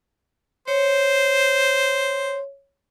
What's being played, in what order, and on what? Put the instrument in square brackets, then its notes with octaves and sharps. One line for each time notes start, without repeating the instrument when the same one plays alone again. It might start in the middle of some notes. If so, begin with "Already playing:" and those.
[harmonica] C5 [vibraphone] C#5